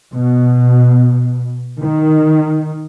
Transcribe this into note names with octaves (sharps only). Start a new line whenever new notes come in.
B2
D#3